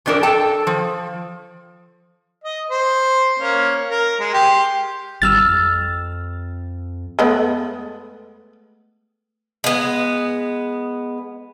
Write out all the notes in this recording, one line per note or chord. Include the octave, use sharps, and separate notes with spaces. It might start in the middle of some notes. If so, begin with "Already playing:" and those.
F2 F3 D4 A4 A#4
A4 G5 A5
F3
D#5
C5
A#3 C#4
A#4
G#3
G4 C6
G#1 G3 E6 F6 A6
F2
G#3 A3 B3
G#3 B3